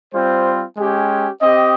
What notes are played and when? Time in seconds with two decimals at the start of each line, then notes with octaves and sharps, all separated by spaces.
0.13 G3 C4 F4 C5
0.77 G#3 C#4 G4
1.41 C4 G4 D#5